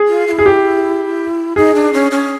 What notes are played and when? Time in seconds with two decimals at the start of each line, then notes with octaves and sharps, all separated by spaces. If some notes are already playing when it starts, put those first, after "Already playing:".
Already playing: G#4
0.08 F4
0.27 F4
0.31 E4
0.39 G#4
0.46 G4
1.56 D#4 G#4
1.75 D4
1.93 C#4
2.11 C#4